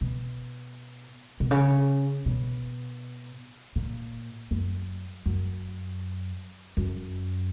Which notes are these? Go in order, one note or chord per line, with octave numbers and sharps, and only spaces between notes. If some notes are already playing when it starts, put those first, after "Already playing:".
B2
B2
C#3
B2
A#2
F#2
F#2
F#2